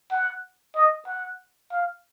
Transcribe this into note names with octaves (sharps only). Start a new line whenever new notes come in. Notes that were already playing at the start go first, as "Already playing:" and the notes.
F#5
D#5
F#5
F5